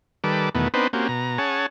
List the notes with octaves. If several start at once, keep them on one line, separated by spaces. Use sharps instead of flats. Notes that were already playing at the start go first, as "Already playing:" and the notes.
D#3 G3 A4 B4 D6
E2 B2 D#3 A3 B3
B3 C4 D4 D#4 B4 C5
A#3 C4 C#4 F#4 G4
B2 A#5
C#4 G#4 C#5 F#5 A5